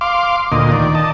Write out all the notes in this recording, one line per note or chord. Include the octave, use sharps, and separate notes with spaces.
F5 C6 D6
D2 A#2 D#5
D#3 D5
D#5 A5